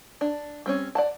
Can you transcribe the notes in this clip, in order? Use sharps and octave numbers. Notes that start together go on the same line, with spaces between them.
D4
G3 C4 C#4
D5 F#5 A5